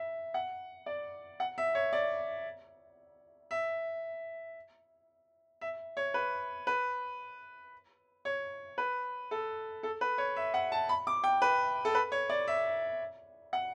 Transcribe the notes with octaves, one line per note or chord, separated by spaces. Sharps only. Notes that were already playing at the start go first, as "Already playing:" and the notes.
Already playing: E5
F#5
D5
F#5
E5
C#5
D5
E5
E5
C#5
B4
B4
C#5
B4
A4
A4
B4
C#5
E5
F#5
A5
B5
D6
G5
B4
A4
B4
C#5
D5
E5
F#5